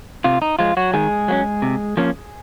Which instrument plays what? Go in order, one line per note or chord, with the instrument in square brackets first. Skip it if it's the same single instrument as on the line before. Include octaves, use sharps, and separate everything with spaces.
[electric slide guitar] C3 F4
D#4
F3 G#3 F4
F#3 F#4
D#3 G#3 G#4
F#3 A#3 C#4
C3
F3 A#3 C#4